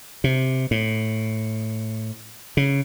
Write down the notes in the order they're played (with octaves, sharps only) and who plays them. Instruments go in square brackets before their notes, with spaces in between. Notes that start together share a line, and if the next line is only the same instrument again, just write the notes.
[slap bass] C3
A2
C#3